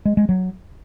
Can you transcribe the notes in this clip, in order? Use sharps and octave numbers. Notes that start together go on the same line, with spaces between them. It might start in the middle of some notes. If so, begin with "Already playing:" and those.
G#3
G#3
F#3